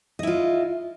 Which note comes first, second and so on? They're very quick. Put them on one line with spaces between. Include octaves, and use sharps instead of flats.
D#5 E4 F4